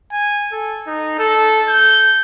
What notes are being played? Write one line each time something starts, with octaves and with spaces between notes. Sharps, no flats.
G#5
A4
D#4
A4
G6